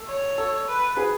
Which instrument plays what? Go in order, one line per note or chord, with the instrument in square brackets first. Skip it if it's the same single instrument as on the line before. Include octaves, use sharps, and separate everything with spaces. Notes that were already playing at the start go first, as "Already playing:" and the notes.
Already playing: [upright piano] A4
[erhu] C#5
[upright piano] A4
[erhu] B4
[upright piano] G#4 B4